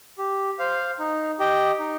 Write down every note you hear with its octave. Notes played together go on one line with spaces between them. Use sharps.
G4
C5 F5
D#4
G4 D#5 G5
D#4